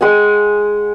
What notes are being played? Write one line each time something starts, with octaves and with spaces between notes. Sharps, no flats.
G#3 F#5 G#5